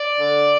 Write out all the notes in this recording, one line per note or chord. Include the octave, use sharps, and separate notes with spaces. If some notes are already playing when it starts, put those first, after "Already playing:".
Already playing: D5
D3